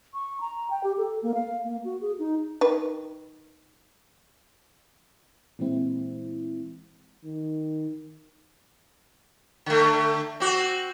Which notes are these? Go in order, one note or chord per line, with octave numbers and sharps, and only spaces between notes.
C#6
A#5
G5
G4
A4
A#3
F5
A#3
F#4
G#4
D#4
D#3 B4
A#2 E3 G#3 C4 E4
D#3
D3 A3
C4 F#4